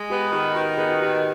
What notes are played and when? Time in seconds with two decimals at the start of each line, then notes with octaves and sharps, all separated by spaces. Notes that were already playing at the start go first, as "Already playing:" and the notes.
Already playing: G#3
0.10 B3 G4
0.32 D#3 G4
0.54 D#3 F#4
0.77 B3 G#4
0.89 F#4
0.99 D#3 G4